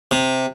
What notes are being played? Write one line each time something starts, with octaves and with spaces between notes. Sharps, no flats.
C3